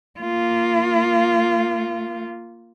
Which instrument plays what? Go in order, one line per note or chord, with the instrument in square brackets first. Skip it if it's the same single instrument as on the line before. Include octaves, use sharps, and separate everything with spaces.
[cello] A#3 F4